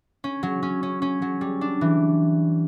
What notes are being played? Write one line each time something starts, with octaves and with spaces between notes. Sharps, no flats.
C#4
F#3
C#4
C#4
C#4
F#3
G3
D4
E3